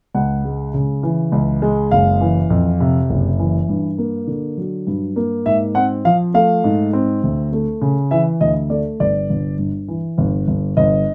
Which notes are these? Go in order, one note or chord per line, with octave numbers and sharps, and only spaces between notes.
C#2 F#5
G#3
C#3
E3
C#2
G#3
F#1 F5
E3
F2
C3
F#1
E3
G2
A#3
D3
F#3
G2
A#3
G#2 E5
C4 F#5
F3 F5
A3 F5
G#2
C4
D2
A3
C#3
E3 E5
D2 D#5
A3 D5
G1 D5
G1
G2
E3
G1
G1
G1 D#5